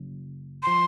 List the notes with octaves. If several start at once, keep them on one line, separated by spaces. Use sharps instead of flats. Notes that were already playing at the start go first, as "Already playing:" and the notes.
Already playing: F#1 F#2 C#3
F3 C6